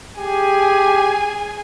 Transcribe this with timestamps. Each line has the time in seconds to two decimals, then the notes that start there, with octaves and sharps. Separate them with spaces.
0.18 G4 G#4 G#5